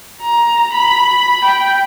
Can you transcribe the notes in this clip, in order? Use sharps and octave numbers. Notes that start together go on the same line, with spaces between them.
A#5
B5
G5